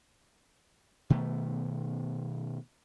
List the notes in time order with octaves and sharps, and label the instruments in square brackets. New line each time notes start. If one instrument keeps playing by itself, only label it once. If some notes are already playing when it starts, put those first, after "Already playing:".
[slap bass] B2 D#3 A3 B3